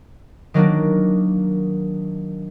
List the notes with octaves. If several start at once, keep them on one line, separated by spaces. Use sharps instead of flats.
D#3 F#3 A#3 D4